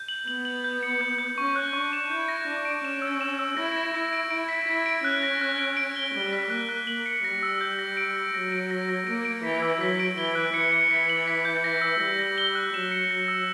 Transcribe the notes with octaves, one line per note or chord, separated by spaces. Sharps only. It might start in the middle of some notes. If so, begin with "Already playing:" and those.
Already playing: G6
F#7
B3 F#7
F#7
G6
C#7
G6
G6
C#4 C#6
F#6
D4 C#6
E7
E4 G6
A#6
D4 A#6
D7
C#4 E7
E6
E7
E6
E4 A#6
A#6
E4 A#6
D7
E4 D7
B6
E4 B6
D7
C#4 F#6
A#6
F#6
D7
D7
G7
G3 G7
B6
A#3 F#6
F#6
A#3 F#7
C#7
G3 A#6
E6
G6
A#6
D7
A#6
F#3 A#6
D7
A#6
A#6
A#3 D7
D7
E3 B6
E6
F#3 B6
D7
E3 G7
F#6
E3 C#7
C#7
E3 B6
F#7
B6
G6
A#6
E6
G3 A#6
A#6
G7
F#6
F#3 E7
C#7
F#3 A#6
E6